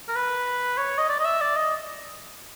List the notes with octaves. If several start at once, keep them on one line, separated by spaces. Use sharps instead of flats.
A#4
B4
C#5
D#5
D5
D#5
E5
D5
D#5